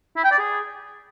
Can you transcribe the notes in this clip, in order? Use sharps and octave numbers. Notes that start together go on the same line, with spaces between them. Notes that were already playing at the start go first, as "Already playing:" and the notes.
E4
G5
D5
G#4